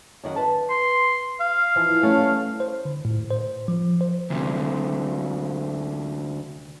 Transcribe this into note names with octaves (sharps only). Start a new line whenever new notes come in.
F#2 D#3 F#5
B4 A5
C6
F5
E3 F3
G3 A3 C#4
C5
D3
A2
C5
F3
C5
D2 C3